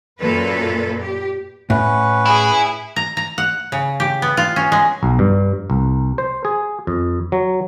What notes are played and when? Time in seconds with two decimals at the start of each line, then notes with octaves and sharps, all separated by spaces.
0.19 F#2 A#2 A4 B4
1.02 G4
1.70 A2 C#4 B4 F#5
2.26 E4 G#4
2.96 A#5
3.17 A#5
3.38 F#5
3.72 C#3
4.00 G4
4.22 B3
4.37 F4
4.56 C#4
4.72 G#3
5.03 B1
5.19 G2
5.70 C2
6.18 C5
6.45 G#4
6.87 F2
7.32 F#3